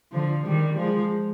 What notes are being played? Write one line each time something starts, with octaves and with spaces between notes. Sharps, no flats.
D3 F3
D#3 G3
F3 G#3